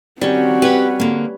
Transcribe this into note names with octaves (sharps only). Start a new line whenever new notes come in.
D#3 G3 C4 C#4 F#4 C#5
G4 B4 C#5 B5
D3 A#3